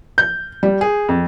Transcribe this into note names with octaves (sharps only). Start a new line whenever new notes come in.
G6
G3
G#4
F2